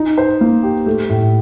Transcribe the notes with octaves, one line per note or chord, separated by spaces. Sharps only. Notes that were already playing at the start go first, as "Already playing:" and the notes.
Already playing: D#4
C5
A#3
G4
A3
A2